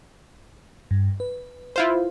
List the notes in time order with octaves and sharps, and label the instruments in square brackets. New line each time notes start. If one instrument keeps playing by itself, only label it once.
[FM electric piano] G2
B4
[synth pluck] E4 F4 C5